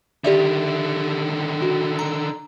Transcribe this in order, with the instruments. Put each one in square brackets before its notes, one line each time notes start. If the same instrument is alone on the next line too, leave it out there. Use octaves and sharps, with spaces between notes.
[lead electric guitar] D3 D#3 [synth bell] G4 D5 E5
[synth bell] F#4
A#5